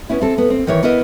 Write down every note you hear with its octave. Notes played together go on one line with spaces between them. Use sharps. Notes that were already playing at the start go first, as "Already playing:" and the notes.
B3 C#4 E4
C4 A4
B3
C4
D#3 E3 C#5
B3 E4 A#4 D#5